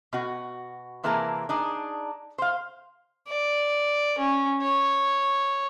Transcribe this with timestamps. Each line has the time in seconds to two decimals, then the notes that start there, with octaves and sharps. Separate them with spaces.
0.13 B2 F#4
1.04 C3 E3 A#3 G#4 A#4 A5
1.49 D4 D#4 G#4 D5
2.38 C5 F5
3.27 D5
4.18 C#4
4.62 C#5